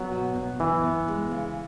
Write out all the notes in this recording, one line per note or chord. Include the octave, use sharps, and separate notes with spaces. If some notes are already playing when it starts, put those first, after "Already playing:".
Already playing: F#3 B3
B2
B2
F#2 E3
B3
G#3
C#3